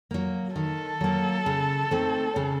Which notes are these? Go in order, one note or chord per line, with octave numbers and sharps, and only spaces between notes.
F#3 A#3
D#3 A4
F#3 A#3
C#3
A3 C4 D#4
C#3